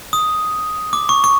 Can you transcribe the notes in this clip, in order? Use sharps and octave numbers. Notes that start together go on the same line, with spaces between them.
D#6
D6
C#6
C#6